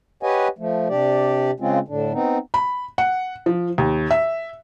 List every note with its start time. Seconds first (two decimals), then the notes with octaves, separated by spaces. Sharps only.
0.23 G4 B4 C#5 D#5 F#5 G#5
0.58 F3 A3
0.89 C3 D4 G4 D5
1.60 C#3 G#3 C4 C#4 F4
1.88 A2 D3 D4
2.13 B3 C4 D#4
2.54 B5
2.98 F#5
3.46 F3
3.78 D#2
4.11 E5